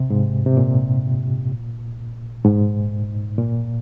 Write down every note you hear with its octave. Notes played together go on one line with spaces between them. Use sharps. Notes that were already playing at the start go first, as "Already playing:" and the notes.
Already playing: C3
G#2
C3
A#2
G#2
A#2